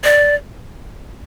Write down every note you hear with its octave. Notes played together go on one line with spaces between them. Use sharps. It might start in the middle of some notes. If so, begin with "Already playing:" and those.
D5